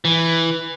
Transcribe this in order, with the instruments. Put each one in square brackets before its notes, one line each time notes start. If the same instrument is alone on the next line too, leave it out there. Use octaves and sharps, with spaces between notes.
[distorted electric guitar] E3